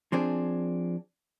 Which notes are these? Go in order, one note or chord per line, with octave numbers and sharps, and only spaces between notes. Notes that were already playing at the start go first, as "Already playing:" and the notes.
F3 C4 D4 G#4